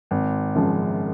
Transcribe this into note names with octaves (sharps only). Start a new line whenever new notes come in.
G#1
F#2 C#3 F3 G#3